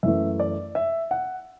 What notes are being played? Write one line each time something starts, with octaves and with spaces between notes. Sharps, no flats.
F#2 E3 A3 E5
D5
E5
F#5